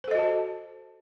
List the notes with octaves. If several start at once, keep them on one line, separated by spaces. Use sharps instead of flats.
F#4 A4 C5 D#5 A5